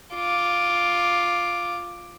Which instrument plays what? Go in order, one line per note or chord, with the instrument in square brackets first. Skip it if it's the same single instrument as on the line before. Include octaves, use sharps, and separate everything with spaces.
[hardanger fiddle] F4 D6